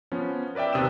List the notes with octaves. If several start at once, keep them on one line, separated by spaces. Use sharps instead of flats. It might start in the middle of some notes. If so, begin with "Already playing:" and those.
F3 B3 C#4
A#4 B4 D5 E5 G5
D#2 C3 D#6 E6 E7